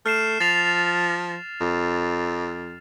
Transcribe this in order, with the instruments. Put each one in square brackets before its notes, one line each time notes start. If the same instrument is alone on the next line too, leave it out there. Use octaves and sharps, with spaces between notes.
[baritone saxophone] A3 [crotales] F6 C7 E7
[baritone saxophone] F3 [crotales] A6 C7 F7
[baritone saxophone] F2